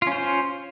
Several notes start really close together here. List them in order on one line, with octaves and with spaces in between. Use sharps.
F4 C#4 C5